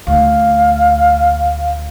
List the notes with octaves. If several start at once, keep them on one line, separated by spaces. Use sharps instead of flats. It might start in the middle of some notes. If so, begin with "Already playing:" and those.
D2 F5